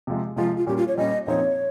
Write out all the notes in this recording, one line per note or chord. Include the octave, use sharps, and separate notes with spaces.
C3 F3 G#3
C3 F3 G#3 F4
F4
A#2 G3 C#4 G4
F4
C#5
A#2 G3 C#4 D#5
A#2 F3 C4 D#4 C#5